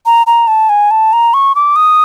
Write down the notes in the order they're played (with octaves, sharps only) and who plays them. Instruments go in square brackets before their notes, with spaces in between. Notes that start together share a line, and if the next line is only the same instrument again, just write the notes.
[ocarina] A#5
A#5
A5
G#5
A5
A#5
C#6
D6
D#6